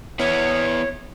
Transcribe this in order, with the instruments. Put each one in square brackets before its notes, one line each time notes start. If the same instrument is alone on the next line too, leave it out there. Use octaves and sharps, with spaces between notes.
[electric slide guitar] B3 E4 [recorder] C#5